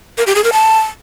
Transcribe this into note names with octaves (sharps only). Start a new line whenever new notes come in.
A#4
G4
G#4
A#4
A5